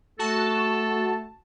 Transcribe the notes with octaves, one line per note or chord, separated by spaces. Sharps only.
A3 F#4 A4 A5